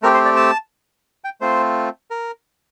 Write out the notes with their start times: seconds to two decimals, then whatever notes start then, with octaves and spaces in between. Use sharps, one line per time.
0.02 A3 C4 G4 A#4
0.14 C5
0.25 D5
0.37 A5
1.24 G5
1.41 A3 C4 F4 C5
2.11 A#4